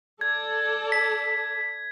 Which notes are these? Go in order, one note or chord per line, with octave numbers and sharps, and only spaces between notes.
A4 D5 A5 G#6
B6